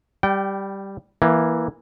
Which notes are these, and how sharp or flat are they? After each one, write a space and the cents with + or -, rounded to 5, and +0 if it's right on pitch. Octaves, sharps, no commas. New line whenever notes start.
G3 +0 G5 -25
E3 +0 A#3 +15